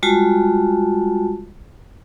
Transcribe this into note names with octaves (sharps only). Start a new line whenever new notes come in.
G3 G#3 F4 F#4 A5